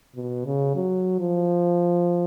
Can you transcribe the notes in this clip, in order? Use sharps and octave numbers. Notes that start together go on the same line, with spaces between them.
B2
C#3
F#3
F3